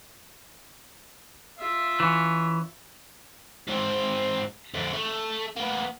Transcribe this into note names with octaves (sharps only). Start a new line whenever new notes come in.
F4 E5
E3 C#4
G#2 C4
F2 D3
A3
A#3 B3